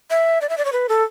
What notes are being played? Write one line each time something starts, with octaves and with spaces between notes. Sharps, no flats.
E5
D5
E5
D5
C#5
B4
A4